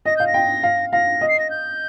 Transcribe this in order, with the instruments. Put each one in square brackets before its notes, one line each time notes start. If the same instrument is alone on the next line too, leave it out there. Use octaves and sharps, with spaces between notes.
[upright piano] D#5 [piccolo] A#6
[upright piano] F5 [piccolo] G6
[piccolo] A#6
[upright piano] G5
F5
[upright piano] F5 [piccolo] A#6
[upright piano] D#5
[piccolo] C7
A#6
G6